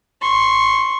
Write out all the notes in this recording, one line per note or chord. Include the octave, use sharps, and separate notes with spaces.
C6 C#6